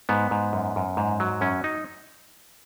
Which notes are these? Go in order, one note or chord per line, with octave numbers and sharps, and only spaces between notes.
G#2 B3
G#2
F#2
F#2
G#2
F#3
F#2 C#4
D#4